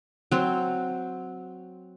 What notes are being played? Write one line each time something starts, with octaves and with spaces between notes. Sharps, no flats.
F#3 C4